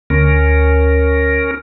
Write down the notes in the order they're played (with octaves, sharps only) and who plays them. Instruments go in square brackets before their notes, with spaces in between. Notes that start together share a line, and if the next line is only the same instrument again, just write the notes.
[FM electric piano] D2 [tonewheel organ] C#4 A#4